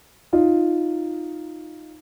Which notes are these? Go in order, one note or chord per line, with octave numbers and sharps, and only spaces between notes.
D#4 F4